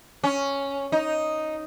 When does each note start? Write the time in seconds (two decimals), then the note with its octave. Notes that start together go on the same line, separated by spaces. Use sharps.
0.23 C#4
0.92 D#4